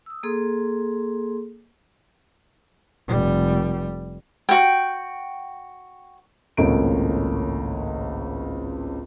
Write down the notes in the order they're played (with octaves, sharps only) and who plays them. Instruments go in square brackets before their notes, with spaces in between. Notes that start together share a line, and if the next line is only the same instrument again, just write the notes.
[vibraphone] D#6 E6
A#3 G#4 A4 C6
[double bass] F1 G3
[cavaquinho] F#4 G5
[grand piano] G#1 C#2 A2 A#3 C#4 D7